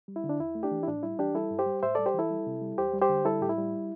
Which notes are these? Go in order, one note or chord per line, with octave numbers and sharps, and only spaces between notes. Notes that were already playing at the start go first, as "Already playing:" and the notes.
G3
E4
D3
D4
E2 E4
A3
D4 G4
E3
E4
A2 D4
G3 E4
E3 D4 G4
G3 E4 A4
G2
G4 C5
G3
A2 C5 E5
G3 A4 D5
G4 C5
E3 E4 A4
G3
C3
G3
E2 G4 C5
G3
G4 C5
D3
G3 E4 A4
A2 G4
E4
G3